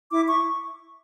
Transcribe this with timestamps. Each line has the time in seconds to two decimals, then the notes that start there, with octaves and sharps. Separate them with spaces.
0.10 E4 D6
0.27 C#6